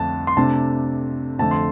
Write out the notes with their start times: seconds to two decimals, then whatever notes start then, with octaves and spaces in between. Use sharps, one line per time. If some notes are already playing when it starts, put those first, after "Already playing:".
Already playing: F2 D3 A3 D4 A5
0.27 C6
0.37 C3 A3 D4 A5
1.39 F2 D3 A3 A5
1.51 C6